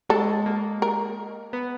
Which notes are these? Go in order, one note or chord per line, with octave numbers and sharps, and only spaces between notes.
G#3 A4
A#3
A#4
B3